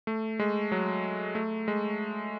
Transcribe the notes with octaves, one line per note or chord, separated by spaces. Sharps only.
A3
G#3
F#3
A3
G#3